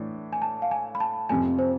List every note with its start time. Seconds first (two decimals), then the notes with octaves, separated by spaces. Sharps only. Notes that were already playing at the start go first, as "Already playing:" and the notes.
Already playing: A2 E3 D4
0.33 G#5
0.42 A5
0.62 F5
0.71 G#5
0.95 B5
1.00 A5
1.29 F2 C3 F3 G#5
1.59 C5